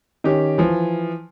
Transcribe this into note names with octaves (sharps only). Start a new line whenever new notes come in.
D#3 C#4 G4
E3 F3